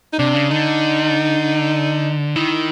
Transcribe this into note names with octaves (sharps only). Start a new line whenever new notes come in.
D#4
C3 D4
C#3
D3 D#4
D#3 E4